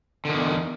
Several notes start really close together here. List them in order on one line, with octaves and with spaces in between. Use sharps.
D3 D#3 E2